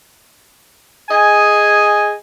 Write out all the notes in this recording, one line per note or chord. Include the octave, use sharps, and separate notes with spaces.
G#4 D#5 G#5